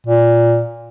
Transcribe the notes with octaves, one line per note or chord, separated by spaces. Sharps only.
A#2